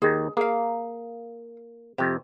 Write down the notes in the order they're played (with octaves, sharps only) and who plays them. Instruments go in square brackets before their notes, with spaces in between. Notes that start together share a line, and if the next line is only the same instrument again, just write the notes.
[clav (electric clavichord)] D#2 D#3 [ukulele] G#4
[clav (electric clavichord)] A#3 [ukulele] G#4 F5
[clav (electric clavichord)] F2 C3 [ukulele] G4